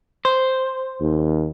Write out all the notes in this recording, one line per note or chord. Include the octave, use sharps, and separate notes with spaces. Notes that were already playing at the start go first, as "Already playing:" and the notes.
C5
D#2